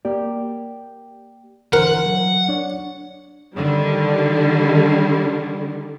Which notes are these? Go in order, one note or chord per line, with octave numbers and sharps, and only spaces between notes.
A#3 G4 D5
D3 E3 A#4 C5 F#5
F#3
D4 C#5
D3 D#3 G3